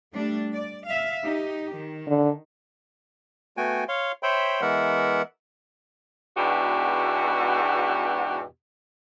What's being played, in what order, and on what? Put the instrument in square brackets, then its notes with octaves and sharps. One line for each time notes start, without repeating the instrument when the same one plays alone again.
[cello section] G3 A3 D4
D5
E5 F5
D#4 G4
D#3
[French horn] D3
[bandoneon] A3 B3 F#4 G5 G#5
C#5 F5 C6
C5 C#5 E5 G5 B5 C6
E3 G#3 B3 A#4 E5 F#5
[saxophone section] E2 G#2 B2 D4 F#4 G4